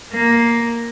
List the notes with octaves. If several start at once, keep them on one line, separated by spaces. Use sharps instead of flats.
A#3